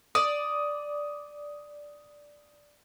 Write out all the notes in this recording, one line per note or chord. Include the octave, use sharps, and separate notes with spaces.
D5 D#6